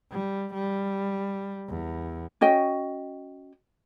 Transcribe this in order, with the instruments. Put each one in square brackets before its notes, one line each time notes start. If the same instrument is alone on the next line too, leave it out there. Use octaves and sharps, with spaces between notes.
[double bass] G3
G3
E2
[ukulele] C#4 F#4 D#5 G5